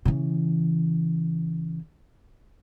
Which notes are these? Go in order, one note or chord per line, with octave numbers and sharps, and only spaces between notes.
C#3 E3